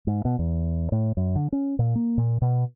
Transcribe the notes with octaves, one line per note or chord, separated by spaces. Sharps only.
G#2
B2
E2
A2
F#2
D3
C#4
A#2
A#3
A#2
B2